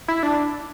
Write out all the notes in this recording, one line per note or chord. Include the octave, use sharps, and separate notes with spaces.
E4
D4